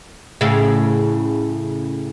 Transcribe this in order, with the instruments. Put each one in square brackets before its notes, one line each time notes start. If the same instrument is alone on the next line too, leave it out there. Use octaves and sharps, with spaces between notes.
[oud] A2 C#3